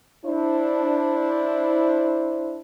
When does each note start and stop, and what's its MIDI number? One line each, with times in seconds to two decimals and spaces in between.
0.25 2.61 62
0.25 2.61 64
0.25 2.61 72